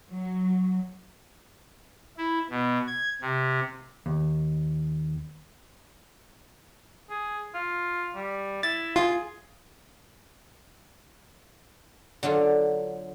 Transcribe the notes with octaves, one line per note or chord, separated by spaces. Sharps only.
F#3
E4
B2
G#6
C3
D#2
G#4
F4
G3
E4 A6
F4 G#4
D3 F#3 D4 F4